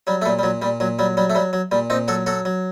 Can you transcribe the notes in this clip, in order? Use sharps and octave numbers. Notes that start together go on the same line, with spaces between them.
F#3 G3
A3
A#2 G3
G3
A#2 F#3
A#2 G3
A#2 F#3
F#3 G3
F#3 G3
A3
F#3 G3
F#3
A#2 G3
A#2 C4 D#4
F#3 F#4 A4
F#3 F#4 A4
F#3